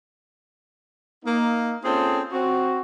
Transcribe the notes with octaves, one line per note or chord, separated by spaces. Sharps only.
A#3 D#4
C4 C#4 F4 G#4 A4 C5
C4 F#4